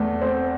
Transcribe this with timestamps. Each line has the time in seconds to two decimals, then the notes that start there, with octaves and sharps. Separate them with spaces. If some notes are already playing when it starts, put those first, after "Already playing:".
Already playing: E2 A3
0.21 C4